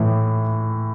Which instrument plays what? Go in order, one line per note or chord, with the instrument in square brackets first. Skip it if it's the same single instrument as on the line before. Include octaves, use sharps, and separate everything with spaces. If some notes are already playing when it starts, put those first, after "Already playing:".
Already playing: [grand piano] A2 E3